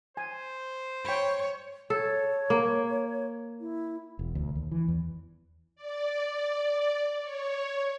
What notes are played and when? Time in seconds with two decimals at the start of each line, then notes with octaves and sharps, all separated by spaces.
0.17 C5 G#5
1.05 C#5 G5 B5
1.90 A4 C#5
2.50 A#3
3.60 E4
4.19 E1
4.35 D2
4.55 D#2
4.71 E3
4.88 E2
5.76 D5
7.22 C#5